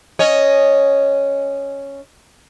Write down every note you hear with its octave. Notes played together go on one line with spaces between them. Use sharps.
C#4 C#5 D#5